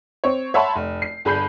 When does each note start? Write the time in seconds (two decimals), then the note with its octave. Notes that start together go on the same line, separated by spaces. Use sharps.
0.24 C4 C#5
0.54 C#5 E5 F#5 A5 B5 C6
0.76 F1
1.02 C7
1.25 G1 G#4 B5 G6 C7